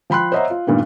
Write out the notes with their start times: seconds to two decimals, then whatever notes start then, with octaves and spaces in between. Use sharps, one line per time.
0.10 F3 G5 B5 C6 F#6
0.32 C5 C#5 D#5 E5 F#5 A#5
0.50 F4
0.67 G2 A#2 D#3 B3